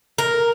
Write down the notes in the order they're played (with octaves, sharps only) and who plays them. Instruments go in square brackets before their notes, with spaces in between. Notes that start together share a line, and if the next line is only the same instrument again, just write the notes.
[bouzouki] A#4